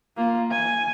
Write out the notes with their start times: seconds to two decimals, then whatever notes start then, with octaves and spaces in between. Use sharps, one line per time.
0.17 A#3 F4
0.51 G#5